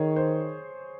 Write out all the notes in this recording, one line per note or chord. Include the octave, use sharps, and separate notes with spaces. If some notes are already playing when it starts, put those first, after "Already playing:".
Already playing: D#3 G#4 C#5
C5